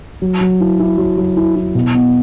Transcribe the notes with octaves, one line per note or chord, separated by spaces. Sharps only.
F#3
F#3
E4
E4
F#3
F#3
E4
E4
B2
B3